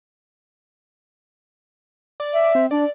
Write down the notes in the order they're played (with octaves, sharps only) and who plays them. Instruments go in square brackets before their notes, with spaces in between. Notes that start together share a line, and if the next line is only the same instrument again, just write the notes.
[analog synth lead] D5
[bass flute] E5
[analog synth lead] C4
[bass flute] D4 [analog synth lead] D5